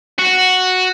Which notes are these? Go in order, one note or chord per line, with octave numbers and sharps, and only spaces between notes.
F#4